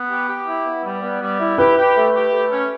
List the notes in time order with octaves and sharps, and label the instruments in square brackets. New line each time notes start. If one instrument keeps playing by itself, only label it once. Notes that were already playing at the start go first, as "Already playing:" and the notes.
Already playing: [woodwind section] B3
G4
G4
E4
B3
G3
B3
G3
E4
[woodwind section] G4 [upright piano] B4
[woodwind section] G4
A3
G4
A3
C#4